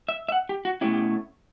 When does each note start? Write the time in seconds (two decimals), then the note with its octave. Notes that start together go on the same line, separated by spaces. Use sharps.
0.09 E5
0.29 E5
0.32 F#5
0.49 G4
0.65 F#4
0.81 B2 A3 C#4 E4 G4
0.93 G4